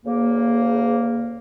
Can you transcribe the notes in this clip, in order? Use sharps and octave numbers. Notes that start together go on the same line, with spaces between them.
D2 C#3 A#3